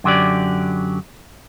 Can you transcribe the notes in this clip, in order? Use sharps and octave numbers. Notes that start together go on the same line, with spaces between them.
F#2 D3 F#3 G4 D5